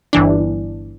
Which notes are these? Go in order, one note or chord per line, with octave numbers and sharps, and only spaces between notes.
G1 E3 D4